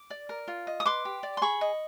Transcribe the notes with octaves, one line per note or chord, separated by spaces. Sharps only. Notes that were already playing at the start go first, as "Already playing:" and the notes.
Already playing: D6
D5
A#4
F4
D#5
D#6
B4 C6 D6
G4
D5
C6
G#4 B5 C#6
D#5